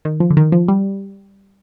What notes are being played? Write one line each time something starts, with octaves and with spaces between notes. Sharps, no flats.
D#3
F3
D3
D#3
F3
G3